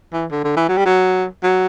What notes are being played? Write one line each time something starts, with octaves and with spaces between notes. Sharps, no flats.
E3
D3
D3
E3
F#3
G3
F#3
F#3